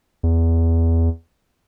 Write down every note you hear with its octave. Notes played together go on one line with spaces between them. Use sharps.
E2